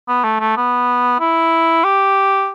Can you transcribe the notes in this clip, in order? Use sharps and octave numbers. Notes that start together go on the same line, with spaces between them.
B3
A3
A3
B3
E4
G4